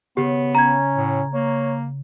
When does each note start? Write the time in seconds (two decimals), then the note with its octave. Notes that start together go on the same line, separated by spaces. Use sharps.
0.17 C#3 B3 G4
0.55 C#4 A#5 G#6
0.95 A2
1.34 A#3 C#5